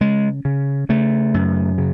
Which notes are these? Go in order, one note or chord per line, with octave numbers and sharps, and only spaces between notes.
C#3 G#3
C#3
C#3 A3
F#2
C#3